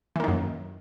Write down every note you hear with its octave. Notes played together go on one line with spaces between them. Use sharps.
F#2 D#3 E3 A#3